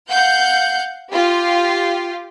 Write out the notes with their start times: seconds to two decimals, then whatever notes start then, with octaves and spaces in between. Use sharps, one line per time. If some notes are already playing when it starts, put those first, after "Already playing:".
0.12 F5 F#5 G6
1.12 F4 G4